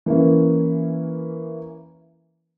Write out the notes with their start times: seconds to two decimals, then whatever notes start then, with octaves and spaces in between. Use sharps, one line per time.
0.06 E3 A#3 C#4 E4